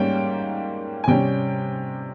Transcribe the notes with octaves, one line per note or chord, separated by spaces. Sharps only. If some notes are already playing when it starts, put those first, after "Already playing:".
Already playing: G#2 G3 A#3 C#4 G5
G#5
C3 G3 C#4 G5